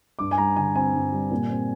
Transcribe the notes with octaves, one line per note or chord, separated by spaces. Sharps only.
G2 D6
G#5
G3 A#5
D3 G#5
C4 G#5
G2
G3
A#2
C4